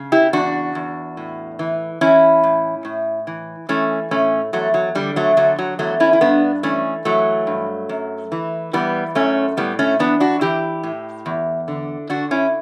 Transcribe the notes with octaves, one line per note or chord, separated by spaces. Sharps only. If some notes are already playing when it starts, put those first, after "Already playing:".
Already playing: C#3
E4 G4
E2 D4 F#4
E2
A2
E3
E3 C#4 E4
A2
A2
E3
E3 A3 C#4
A2 A3 C#4
E2 F#3 A3
F#3
D3 G3
F#3 A3
D3 F#3 A3
F#3
E2 F#3 A3
C#4 E4
E4
G2 B3 D4
E3 A3 C#4
E3 F#3 A3
G2
F#2
E3
E3 G3 B3
F#2 A3 C#4
A2 G3 B3
A3 C#4
E3 B3 D4
D4 F#4
E3 E4 G4
A2
E2
D3
D3 D4 F#4
C#4 E4